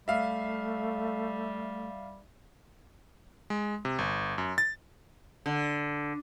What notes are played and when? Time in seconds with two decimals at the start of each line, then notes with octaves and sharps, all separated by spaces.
0.08 G3 A3 E5 F5
3.50 G#3
3.85 C3
3.99 G1
4.38 F#2
4.58 A6
5.46 D3